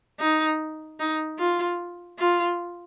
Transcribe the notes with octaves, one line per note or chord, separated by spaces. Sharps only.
D#4
D#4
F4
F4